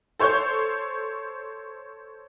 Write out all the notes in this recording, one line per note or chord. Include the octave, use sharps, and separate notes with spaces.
A4 C5 C#5 C#6 G6